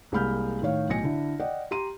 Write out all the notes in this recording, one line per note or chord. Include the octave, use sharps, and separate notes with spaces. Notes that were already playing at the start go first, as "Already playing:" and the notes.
C2 G#3 A#3 B5 F6 G6
A2 D#3 C#5 F5
B1 A2 G#5 A#6 C#7
D3 D4 E4
D5 D#5 F#5 G5
G4 A#5 C6 D#7